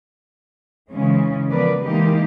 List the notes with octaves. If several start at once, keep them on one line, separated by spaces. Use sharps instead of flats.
C#3 E3 G#3 C#4
F3 B3 A#4 B4 D5
E3 G#3 A#3 D#4 G4